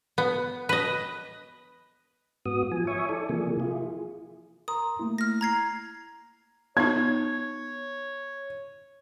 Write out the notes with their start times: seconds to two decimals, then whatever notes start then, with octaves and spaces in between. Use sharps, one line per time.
0.18 B3
0.69 B4 D#5
2.46 G#2 B3 F#4 D#6
2.72 F3 G#5
2.87 C#5 E5 G#5 C#6 D#6
3.09 E4 A4 D5
3.29 C3 E3 F3 A#3 G#4
3.60 E4 F4 G#4
4.68 A#4 A#5 C6 D#6
4.99 A3 A#3 E4
5.18 F6 A#6
5.41 A#5 G#6 C7
6.77 B3 D#4 C#5 G#6